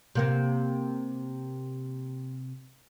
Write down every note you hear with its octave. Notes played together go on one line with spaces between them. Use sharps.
C3 A#3 C4